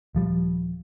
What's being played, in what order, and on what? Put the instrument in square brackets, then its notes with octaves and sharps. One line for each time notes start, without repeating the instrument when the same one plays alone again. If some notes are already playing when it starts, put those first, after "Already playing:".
[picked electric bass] D#1 F3 G3